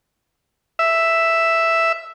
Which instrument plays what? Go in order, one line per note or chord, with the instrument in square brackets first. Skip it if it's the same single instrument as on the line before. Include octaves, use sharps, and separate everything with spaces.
[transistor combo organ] E5